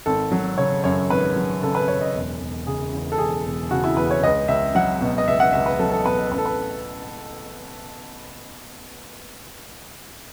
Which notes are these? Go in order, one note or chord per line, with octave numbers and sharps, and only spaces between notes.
G#1 A4
F#3
C#3 C#5
F#2 C#5
G#1 B4
F#3
C#3 A4
B4
F#2 C#5
D#5
E1
E1
C#3 G#4
E2
A4
E1 G#4
E1
C#3 F#4
E4
E2 B4
C#5
C#2 D#5
C#2 E5
F#3 F#5
B2
D#5
C#2 E5
F#5
C#2 E5
B4
F#3 A4
A4
B2 B4
A1 B4
A4
B4